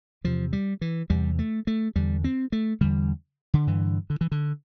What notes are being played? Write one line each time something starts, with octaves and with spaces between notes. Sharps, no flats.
E2 C3 F3
G3
E3
E2 C3 G3
A3
A3
E2 D3 G3
C4
A3
E2 D3 G3
D3
G2 D3 E3
D3
E3
D3